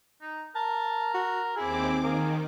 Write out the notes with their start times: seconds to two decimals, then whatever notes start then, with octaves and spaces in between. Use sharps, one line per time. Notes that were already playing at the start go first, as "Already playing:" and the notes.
0.21 D#4
0.56 A#4 A5
1.14 F#4
1.57 D#2 C4 E4 G#4 D6
2.03 D#3 A#3 G#4